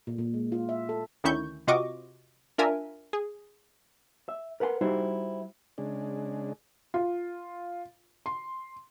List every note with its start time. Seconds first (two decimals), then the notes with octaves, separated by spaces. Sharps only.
0.07 A#2
0.19 A#2
0.34 G#3
0.52 F4
0.69 E5
0.89 A4
1.24 D2 D#3 C#4 E4 C#6 G6
1.67 C3 F4 F#4 D#5 C#6 D6
2.58 D4 F4 A#4 E5 G#5
3.13 G#4
4.29 E5
4.60 A#4 B4 F#5 G5 C6
4.81 G3 D#4 E4 F#4 C5
5.78 C#3 G#3 D4
6.94 F4
8.26 C6